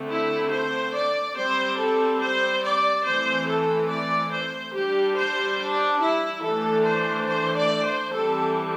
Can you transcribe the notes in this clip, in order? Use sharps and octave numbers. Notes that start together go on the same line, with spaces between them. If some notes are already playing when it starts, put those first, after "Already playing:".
Already playing: D3 A3 C4
E4
C5
D5
G3 C4 C5
A4
C5
D5
E3 A3 C4 C5
A4
D5
C5
G3 D4 G4
C5
D4
E4
E3 A3 D4 A4
C5
C5
D5
C5
E3 G3 C4 A4